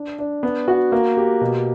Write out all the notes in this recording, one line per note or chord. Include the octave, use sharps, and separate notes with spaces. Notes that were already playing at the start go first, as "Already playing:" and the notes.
Already playing: D4
D4
B3
F#4
A#3
G4
B2